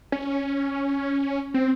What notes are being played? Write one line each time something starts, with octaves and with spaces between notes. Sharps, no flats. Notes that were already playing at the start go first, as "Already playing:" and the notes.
C#4
C4